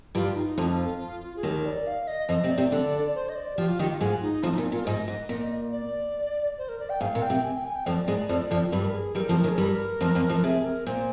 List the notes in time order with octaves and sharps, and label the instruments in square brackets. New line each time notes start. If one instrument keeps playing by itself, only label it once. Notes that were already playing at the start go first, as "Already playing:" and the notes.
[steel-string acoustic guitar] G2 G3 [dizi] F4
[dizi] D#4
[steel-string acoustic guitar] F2 F3 [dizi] F4
[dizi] G#4
[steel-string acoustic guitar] D#2 D#3 [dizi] G4
[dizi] D5
F5
D#5
[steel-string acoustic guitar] F2 F3 [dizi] D#5
[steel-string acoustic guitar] C3 C4
[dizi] D5
[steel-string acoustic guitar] C3 C4
D3 D4
[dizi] C5
D#5
D5
[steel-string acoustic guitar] F3 F4 [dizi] G4
[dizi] F4
[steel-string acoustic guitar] D#3 D#4 [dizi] G4
[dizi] F4
[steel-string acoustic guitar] G#2 G#3 [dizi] F4
[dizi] D#4
[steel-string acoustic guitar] F2 F3 [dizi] F4
[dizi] D#4
[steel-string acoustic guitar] A#2 [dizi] F4
[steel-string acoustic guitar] A#2 [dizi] F4
[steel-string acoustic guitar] G#2 [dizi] D#5
[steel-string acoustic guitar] G#2
A#2
[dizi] D5
C5
A#4
D5
G5
[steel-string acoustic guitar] G#2 [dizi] F5
[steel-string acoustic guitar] A#2
[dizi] G5
[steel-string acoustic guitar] C3
[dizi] G#5
G5
G#5
G5
[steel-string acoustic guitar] F2 F3 [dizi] D5
[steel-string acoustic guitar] G#2 G#3
F2 F3
F2 F3
[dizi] F4
[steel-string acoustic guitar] G2 G3 [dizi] G4
[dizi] A#4
G#4
[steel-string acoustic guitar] G2 G3 [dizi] A#4
[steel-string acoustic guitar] F2 F3
[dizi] A#4
[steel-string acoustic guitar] D#2 D#3
[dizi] G#4
[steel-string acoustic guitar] G2 G3 [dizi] A#4
[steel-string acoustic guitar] F2 F3
F2 F3
F2 F3
[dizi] A#4
[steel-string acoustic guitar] C3 [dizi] G#4
[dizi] A#4
[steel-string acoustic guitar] A#2 [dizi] C5